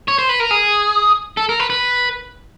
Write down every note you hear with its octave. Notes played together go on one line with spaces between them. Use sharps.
C#5
C5
B4
A#4
G#4
A4
A#4
B4
B4